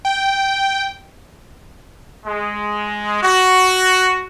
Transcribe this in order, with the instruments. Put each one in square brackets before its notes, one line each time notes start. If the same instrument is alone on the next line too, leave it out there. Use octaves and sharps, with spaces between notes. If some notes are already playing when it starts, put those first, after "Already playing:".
[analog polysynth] G5
[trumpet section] G#3
F#4